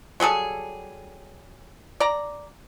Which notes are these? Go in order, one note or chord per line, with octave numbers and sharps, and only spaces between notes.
F#3 G3 G#4 A4
D5 A#5